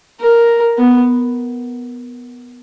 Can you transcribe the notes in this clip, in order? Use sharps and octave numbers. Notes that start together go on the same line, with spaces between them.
A#4
B3